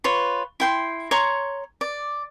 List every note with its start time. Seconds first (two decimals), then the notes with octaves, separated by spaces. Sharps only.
0.04 F4 B4 C#5
0.60 E4 G5 C6
1.11 C#5 A#5 C6 C#6
1.81 D5